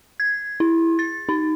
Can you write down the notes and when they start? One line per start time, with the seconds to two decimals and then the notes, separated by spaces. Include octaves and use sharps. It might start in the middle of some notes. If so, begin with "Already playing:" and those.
0.20 G#6
0.60 E4
0.99 A6
1.29 D#4